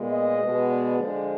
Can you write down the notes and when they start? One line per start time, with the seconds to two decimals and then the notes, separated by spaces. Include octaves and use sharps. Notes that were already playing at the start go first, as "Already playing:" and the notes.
Already playing: A#2 G#3 B3
0.11 D#5
0.40 B2 G#3 B3
0.69 D5
0.98 D3 F3 G#3